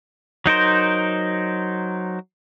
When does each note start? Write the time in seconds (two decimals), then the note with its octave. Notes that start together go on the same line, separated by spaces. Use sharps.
0.46 F#3 D#4 A#4 C5